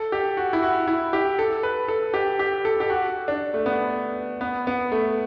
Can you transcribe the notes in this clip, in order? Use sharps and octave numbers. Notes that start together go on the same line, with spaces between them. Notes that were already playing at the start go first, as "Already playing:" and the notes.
Already playing: A4
G4
F#4
E4
F#4
E4
G4
A4
B4
A4
G4
G4
A4
G4
F#4
D4
A3
B3
B3
B3
A3